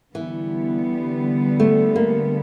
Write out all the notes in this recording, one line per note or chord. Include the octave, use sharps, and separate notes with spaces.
D3 E3 G3 B3
A3
A#3